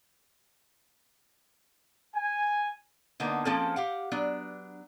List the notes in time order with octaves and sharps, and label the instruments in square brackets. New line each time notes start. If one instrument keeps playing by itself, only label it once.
[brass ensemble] G#5
[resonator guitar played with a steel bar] D3 A#3 B3 D#4
F3 A#3 C4 C#4 G#4 A4
G4 F5 F#5
F#3 B3 D4